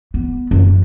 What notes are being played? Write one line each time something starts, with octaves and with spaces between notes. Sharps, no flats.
B3
F#2 E3